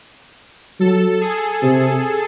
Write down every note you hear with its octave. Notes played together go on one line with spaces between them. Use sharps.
F#3 A4
G#4
C3